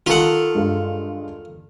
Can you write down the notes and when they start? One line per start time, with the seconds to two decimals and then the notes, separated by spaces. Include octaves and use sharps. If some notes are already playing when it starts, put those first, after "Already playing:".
0.06 D#3 F4 A4 F#5
0.55 G2 G#3 F5